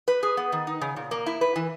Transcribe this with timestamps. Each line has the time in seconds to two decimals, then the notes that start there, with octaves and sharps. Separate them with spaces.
0.08 B4
0.23 G#4
0.37 B3
0.52 D#3
0.67 D#4
0.81 C#3
0.96 A#2
1.11 A#3
1.26 E4
1.41 B4
1.56 E3